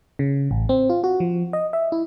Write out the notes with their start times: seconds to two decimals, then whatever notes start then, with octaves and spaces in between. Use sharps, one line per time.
0.19 C#3
0.51 A1
0.69 C4
0.90 F4
1.04 F#4
1.20 F3
1.53 D#5
1.73 E5
1.92 E4